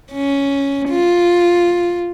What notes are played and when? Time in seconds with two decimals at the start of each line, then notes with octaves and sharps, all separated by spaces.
0.12 C#4
0.90 F4